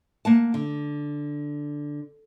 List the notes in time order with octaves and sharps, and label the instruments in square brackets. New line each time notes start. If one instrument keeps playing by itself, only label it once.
[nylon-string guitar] A#3 F#5 A5
D3